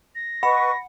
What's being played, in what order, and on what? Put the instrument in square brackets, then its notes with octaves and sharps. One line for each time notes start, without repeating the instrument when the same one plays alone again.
[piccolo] A#6
[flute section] B4 D#5 C#6 [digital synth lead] F#5 [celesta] B5